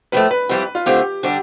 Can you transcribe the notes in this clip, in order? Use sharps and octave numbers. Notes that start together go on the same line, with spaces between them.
A2 F3 A3 B4
B4
F2 E3 G3 C4
F4
D3 A3 C4 F4 G4
D3 G3 D4 G4